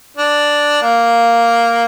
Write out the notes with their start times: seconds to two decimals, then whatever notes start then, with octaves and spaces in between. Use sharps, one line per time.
0.17 D4
0.82 A#3